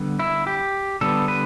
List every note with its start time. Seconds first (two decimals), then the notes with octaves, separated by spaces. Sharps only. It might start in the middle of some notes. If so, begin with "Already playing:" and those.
Already playing: D3 G3 B3
0.19 E4
0.47 G4
1.01 D3 G3 B3 A4
1.28 B4